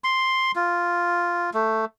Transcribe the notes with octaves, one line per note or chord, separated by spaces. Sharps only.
C6
F4
A3